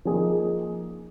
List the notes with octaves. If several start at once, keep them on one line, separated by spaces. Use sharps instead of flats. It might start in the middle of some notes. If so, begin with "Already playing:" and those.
F3 A#3 D#4 G#4